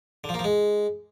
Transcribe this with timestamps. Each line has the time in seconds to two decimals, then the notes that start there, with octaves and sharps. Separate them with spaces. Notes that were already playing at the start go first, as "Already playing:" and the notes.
0.24 D3
0.29 F3
0.34 A#3
0.39 F3
0.44 G#3